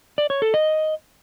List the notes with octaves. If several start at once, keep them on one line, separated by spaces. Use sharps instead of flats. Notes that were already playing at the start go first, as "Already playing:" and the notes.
D5
C#5
A4
D#5